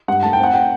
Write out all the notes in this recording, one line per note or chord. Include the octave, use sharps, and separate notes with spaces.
G2 F#5
A3 A5
G5
C4 F#5
G5